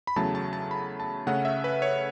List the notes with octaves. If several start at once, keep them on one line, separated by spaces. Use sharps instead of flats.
B5
E2 C#3 F#3 A3 A5
A5
A5
B5
A5
C#3 A3 C#4 F#5
E5
B4
C#5